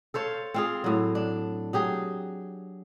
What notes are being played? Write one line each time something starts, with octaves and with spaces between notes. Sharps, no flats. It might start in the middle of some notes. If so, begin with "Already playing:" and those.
A4 C5 C#5 F5
C4 F4 G#4
A2 F#3
D4
F#3 G4 G#4